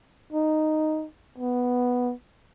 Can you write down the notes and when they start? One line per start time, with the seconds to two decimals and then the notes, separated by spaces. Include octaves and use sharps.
0.33 D#4
1.38 B3